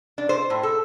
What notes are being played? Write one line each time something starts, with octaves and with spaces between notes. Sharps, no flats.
D4
C5
A2
A4